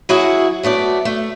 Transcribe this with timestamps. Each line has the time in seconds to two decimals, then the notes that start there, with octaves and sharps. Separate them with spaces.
0.09 F#3 E4 F#4 G#4
0.63 F#3 A3 B3 D5
1.05 A3